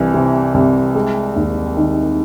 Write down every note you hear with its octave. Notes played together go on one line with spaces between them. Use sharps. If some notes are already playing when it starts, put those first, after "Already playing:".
Already playing: C2 E3
C3
C2
G#3
D#2
D#3